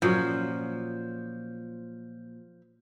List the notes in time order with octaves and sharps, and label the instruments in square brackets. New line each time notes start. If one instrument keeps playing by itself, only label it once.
[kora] A#2 F#3 C#4 [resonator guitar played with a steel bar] F3